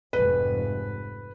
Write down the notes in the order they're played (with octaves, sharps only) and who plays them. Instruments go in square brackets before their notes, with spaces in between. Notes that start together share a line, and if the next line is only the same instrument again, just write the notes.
[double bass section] F1 G#2 [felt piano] B4